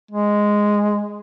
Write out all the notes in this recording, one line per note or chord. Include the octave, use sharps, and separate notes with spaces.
G#3